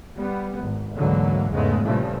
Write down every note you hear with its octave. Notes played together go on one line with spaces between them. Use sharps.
G3 B3
G#1
D2 G#2 D3 E3 F#3 A#3
E2 G#2 C#3 G#3 A3 B3
G2 A#2 C#3 E3 F3 A3